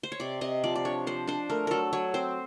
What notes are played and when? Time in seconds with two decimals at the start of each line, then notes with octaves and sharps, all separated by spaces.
0.03 C5
0.12 C#5
0.20 C3 D5
0.41 C3 D#5
0.64 F3 D5
0.76 D5
0.85 D4 C#5
1.07 F3 C5
1.27 D4 C5
1.50 A3 A#4
1.67 F#3 A4 A#4
1.93 F#3 C#5
2.14 C4 C5